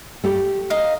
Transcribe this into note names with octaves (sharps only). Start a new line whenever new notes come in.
A3 G4
D#4 D#5 F5